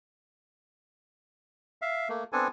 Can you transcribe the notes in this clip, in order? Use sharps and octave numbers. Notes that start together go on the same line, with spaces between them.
E5 F5
A3 A#3
B3 C4 D4 A4 G#5